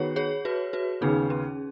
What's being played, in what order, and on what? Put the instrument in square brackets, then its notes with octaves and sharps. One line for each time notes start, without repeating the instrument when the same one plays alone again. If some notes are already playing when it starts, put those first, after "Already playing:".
Already playing: [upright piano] D#3 B3 F#4 B4 [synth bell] G#4 C#5
[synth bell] G#4 C#5
F#4 B4
F#4 B4
[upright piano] D#2 C#3 B3 [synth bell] D#4 G#4
[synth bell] C#4